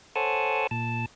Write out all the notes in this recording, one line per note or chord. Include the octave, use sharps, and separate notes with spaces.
A4 C5 C#5 F#5 G#5 A5
A#2 A5